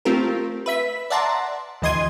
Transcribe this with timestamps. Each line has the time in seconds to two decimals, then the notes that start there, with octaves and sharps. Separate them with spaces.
0.05 A3 C4 F4 G4 A#4
0.66 B4 E5 B6
1.10 D5 E5 F#5 A5 A#5 C6
1.82 D2 E3 D#5 C6 G#6 D#7